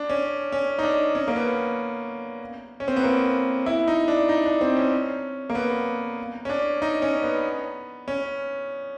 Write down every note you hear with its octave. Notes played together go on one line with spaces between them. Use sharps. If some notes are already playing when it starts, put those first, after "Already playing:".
Already playing: D4
C#4
C#4
D#4
D4
C#4
A#3
B3
C#4
C4
B3
A#3
E4
D#4
D4
D#4
D4
C4
C#4
A#3
B3
C#4
D4
D#4
C#4
B3
C#4